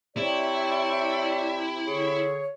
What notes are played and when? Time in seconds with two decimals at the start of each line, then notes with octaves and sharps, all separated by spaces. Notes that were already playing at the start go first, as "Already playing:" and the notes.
0.17 C3 E4 C#5 D5
1.86 D3 G#4 C#5